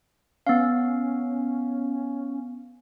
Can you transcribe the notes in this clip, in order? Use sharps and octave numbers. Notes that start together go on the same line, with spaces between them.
B3 C#4 F5